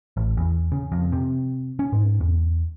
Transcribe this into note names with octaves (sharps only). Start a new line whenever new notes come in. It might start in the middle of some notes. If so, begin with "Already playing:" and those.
A1
E2
C#3
F2
C3
C#4
G#2
E2